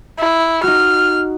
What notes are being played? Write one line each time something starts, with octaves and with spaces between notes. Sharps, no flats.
E4
D#4 F#4 F6